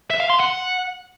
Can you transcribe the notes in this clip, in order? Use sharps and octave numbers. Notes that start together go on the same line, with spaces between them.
E5
F5
C6
F#5